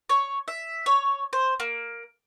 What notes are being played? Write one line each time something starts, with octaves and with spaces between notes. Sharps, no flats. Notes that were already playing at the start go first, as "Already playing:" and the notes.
C#5
E5
C#5
C5
A#3